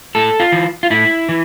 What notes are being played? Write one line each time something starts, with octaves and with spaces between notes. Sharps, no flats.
A2 A4
F4
E3
F4
A2 E4
E3